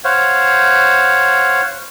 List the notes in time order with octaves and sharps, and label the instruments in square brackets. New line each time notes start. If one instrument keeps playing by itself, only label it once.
[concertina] C5 C#5 F5 F#5